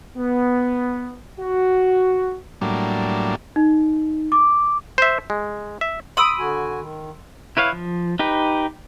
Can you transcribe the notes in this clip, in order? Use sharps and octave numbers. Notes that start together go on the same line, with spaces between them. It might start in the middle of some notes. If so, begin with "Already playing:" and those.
B3
F#4
A2 F#3 G3 A#3 D4
D#4
D6
C5 E5
G#3
E5
B5 C6 D#6 E6 D7
D3 F#4 G#5
D#3
E4 B4 C#5 F5
F3
D#4 G4 B4